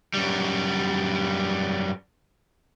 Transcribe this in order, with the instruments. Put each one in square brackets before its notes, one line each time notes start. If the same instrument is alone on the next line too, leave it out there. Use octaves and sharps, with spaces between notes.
[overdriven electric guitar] F#2 G3